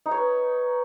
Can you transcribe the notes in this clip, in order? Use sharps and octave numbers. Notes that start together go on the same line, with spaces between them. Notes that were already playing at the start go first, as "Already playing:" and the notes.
D#4
C#5
B4